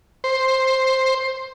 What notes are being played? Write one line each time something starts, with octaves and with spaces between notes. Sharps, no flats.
C5